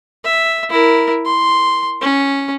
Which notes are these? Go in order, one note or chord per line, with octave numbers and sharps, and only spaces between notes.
E5
E4 A#4
C6
C#4